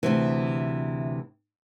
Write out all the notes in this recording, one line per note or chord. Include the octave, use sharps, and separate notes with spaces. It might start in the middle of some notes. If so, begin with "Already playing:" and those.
D2 C3 E3